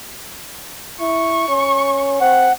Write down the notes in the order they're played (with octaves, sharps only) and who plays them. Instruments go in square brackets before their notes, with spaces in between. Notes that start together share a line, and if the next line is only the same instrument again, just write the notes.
[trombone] E4 [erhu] C#6
[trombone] C#4
[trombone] C4 [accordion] F#5